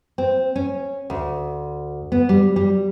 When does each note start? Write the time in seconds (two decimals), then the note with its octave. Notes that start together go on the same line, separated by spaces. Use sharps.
0.18 C4
0.56 C#4
1.10 D2
2.12 B3
2.29 G3
2.56 G3